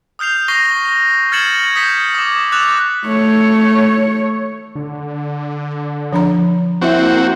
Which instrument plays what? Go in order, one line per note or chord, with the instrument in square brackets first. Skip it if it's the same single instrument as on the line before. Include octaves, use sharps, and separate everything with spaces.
[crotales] D#6 F6 G6 C7 F7
C#6 A#6 C7 F7 G7
F6 G#6 A6 C#7 E7 F#7
D#6 G6 B6 C#7
D6 D#6
D6 E6 F#6 A6 F7
[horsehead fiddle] A3 C#5
[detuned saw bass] D3
[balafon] F3 D4 A#5
[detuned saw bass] A#3 [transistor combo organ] C4 F#4 [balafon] E4 E5